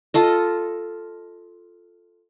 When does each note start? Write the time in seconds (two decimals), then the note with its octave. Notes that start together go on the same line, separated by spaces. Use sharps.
0.14 F4 A4 D#5